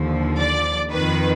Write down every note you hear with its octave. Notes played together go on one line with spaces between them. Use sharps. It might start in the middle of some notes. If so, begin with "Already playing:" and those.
Already playing: D#2 D3 F3
D5
F2 D#3 B4